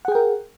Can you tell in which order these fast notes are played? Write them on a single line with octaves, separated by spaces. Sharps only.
F#5 G#4 G5 A#4